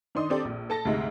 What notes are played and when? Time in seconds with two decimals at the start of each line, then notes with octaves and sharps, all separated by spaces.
0.15 D#3 D4 D#4 C6 D#6
0.30 C4 D4 G4 A4 D5
0.45 A#1
0.70 A4 A5 A#6
0.85 D2 G#2 C3 G#3